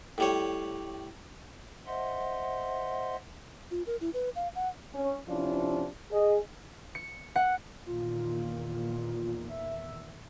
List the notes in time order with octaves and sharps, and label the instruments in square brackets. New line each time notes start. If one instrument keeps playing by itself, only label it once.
[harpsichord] A2 G3 C#5
[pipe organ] C5 D#5 E5 F#5 C6
[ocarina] F4
A#4
E4
B4
F5
F#5
[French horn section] C#4
C3 F3 C#4 D4 E4 F4
G#4 D#5
[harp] C#7
F#5
[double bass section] E2 A#2 D#3 [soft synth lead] F4
[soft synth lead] E5